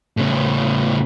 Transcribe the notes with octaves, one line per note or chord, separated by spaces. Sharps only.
A2 C#3